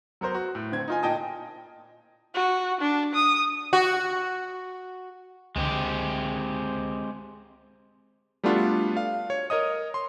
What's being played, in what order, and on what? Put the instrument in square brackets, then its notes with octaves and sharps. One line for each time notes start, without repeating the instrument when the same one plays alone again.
[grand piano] F#3 B3 A#4 C5
F#4
A2
D3 C4 G#6
D#4 F4 G#5
A#2 D#5 G5 A5 D#6
[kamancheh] F#4
D4
D#6
[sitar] F#4
[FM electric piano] C#2 D3 [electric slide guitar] G#3 C4 G4
[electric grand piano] G3 A3 B3 D4 F4 F#4
F5
C#5
A#4 C#5 D#5 D#6
C6